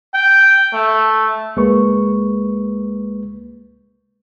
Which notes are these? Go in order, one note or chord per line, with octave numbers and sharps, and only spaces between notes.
G5
A3
C#2 G#3 A#3 B4 C#6